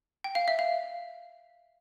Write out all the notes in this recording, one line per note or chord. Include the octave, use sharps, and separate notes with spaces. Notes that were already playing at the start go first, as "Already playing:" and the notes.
G5
F5
E5
F5